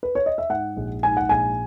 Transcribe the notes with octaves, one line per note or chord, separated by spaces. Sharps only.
B4
C#5
D#5
E5
G#2 F#5
A#1
G#2 G#5
F#5
A#1 G#5